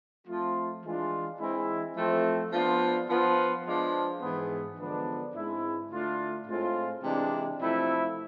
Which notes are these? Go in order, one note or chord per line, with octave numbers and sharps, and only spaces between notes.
F3 A3 C4 F4
E3 G#3 D4 F4
E3 G#3 C4 E4
F3 A3 C4
F3 B3 D4 F4
F3 B3 F4
F3 G#3 D4 F4
G#2 E3 B3
D3 F3 G#3 B3 D4
G#2 G#3 C4 E4
D3 A3 D4 F4
A2 G#3 C4 F4
C3 E3 G#3 D4
C3 F3 A3 E4